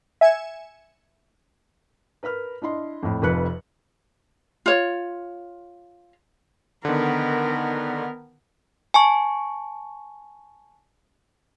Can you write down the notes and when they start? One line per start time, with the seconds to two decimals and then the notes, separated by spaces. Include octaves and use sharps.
0.21 E5 G#5 G#6 C#7 E7
2.23 A#4 B4 B5 F6
2.62 D4 E4 D#5 C6
3.03 F2 A2
3.22 F1 F2 F3 B4 F#6 C#7
4.66 F4 C#5
6.85 D3 D#3 B3 A#4
8.94 G#5 A5 C#6